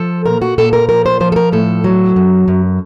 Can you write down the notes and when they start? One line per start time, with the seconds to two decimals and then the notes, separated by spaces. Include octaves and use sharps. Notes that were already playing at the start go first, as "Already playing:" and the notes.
Already playing: F3 A4
0.26 A#2 A#4
0.42 F#4
0.58 A#2 A4
0.73 A#4
0.89 F3 A#4
1.06 C5
1.20 F3 C5
1.32 A4
1.36 A#4
1.52 A2 A4
1.84 F#3
2.16 F#2
2.48 F#2